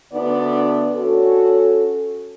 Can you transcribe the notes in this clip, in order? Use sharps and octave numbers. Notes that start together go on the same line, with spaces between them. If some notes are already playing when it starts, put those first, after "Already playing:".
D2 D3 B3 D4 D5
C#4 F#4 A4